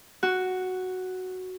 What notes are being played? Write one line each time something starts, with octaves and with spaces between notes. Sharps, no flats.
F#4